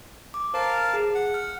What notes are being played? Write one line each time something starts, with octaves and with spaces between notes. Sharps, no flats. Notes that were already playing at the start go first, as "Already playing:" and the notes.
D6
A#4 C5 F5 A5
G#4
F#5
F6